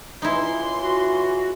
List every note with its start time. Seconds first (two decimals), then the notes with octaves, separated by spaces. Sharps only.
0.22 C#2 E3 D#4 E4 C6
0.81 F#4